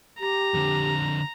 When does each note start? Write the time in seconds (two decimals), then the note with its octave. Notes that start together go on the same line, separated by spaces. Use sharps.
0.20 G4 A#5
0.54 F2 D3